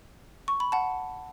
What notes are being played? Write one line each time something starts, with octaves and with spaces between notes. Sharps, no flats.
C#6
B5
F#5 A5